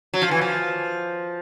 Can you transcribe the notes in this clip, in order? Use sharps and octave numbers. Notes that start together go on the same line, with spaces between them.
F#3
F3
E3
F3